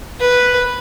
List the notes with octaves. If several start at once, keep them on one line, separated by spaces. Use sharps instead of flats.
B4